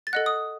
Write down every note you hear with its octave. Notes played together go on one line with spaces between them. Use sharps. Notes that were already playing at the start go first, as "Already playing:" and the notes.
A6
A4 D#5 F#5 F#6
D#6